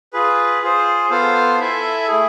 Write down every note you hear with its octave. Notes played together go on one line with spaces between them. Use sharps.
F4 G#4 B4
F4 G#4 C5
B3 F4 A4 C5 F5
E4 A4 E5 G#5
A3 E4 G#4